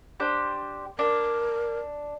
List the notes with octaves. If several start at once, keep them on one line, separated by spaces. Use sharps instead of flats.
D4 G4 C5
D4 A#4